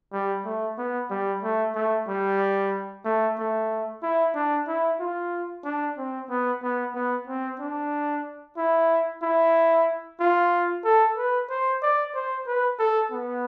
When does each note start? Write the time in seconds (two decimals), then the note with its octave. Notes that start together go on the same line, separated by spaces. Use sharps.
0.13 G3
0.45 A3
0.78 B3
1.10 G3
1.43 A3
1.75 A3
2.08 G3
3.05 A3
3.38 A3
4.02 E4
4.35 D4
4.67 E4
5.00 F4
5.64 D4
5.97 C4
6.29 B3
6.62 B3
6.94 B3
7.27 C4
7.59 D4
8.57 E4
9.22 E4
10.20 F4
10.84 A4
11.17 B4
11.50 C5
11.82 D5
12.14 C5
12.47 B4
12.79 A4
13.11 B3